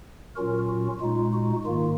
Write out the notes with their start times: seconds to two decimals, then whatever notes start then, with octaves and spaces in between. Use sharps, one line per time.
0.36 A#2 F#3 C#4 F4 F#4 A#4
0.68 F#4
1.01 A#2 G#3 D#4 F4
1.33 F#4
1.65 G#2 D#3 A#3 F4